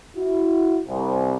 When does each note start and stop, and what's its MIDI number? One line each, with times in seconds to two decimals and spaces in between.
0.17 0.81 64
0.17 0.81 66
0.88 1.37 36
0.88 1.37 48